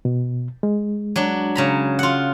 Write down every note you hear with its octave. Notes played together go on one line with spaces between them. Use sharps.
B2
G#3
F#3 D4
C#3 A#5 B5
F4 F#5